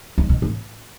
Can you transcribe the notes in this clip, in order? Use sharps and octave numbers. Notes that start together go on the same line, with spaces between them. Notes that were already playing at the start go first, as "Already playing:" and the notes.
G2
B2
A2